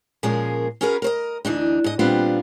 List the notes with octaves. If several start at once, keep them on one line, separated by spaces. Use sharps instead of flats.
A#2 F3 G#3 C#4 G#4 A#4
C#4 F#4 G#4 A#4 B4
A#4 C5 D#5
D2 E3 D4 D#4
G#2 D#5
A#2 G3 B3 C4 D4 F4